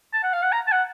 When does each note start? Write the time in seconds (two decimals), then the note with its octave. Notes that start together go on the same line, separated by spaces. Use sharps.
0.13 A5
0.23 F#5
0.33 F5
0.43 F#5
0.52 A#5
0.67 A5
0.72 F#5